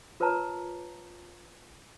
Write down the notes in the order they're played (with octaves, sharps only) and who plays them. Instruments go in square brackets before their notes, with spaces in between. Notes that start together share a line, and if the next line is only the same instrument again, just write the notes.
[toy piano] F4 A#4 B4 C#5 A5 A#5